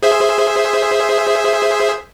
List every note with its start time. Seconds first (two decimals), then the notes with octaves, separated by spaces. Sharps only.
0.03 G#4 C5 E5